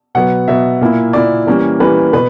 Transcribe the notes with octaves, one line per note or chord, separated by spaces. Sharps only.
B2 F#3 B3 F#5
B2 F#3 B3 E5
A#2 A#3 E4
A#2 A#3 E4 D5
E3 G3 A#3 C#4
E3 G3 A#3 C#4 B4
B2 B4